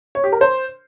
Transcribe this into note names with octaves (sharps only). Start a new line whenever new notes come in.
C#5
G4
A#4
C5